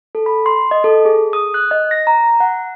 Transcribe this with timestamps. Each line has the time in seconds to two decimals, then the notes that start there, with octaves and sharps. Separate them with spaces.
0.15 A4
0.26 B5
0.46 C6
0.71 D#5
0.84 A4
1.05 G#4
1.33 D#6
1.54 F#6
1.71 D#5
1.91 A#6
2.07 A#5
2.40 F#5